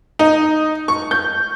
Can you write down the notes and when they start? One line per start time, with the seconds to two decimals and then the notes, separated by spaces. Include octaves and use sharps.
0.19 D#4
0.88 C#6
1.11 G6